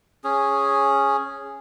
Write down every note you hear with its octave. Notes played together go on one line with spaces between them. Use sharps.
C#4 G#4